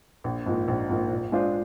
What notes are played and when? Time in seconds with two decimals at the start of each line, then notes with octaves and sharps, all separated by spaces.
0.24 A#1
0.46 G#2 F3 A#3
0.68 A#1
0.90 G#2 F3 A#3
1.11 A#2
1.32 G#3 D4 F4 C5